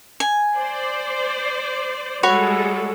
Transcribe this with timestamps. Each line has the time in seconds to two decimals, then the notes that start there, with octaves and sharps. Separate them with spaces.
0.20 G#5
0.56 C5 D5
2.23 G3 G#3 F#4 A4 C#5 B5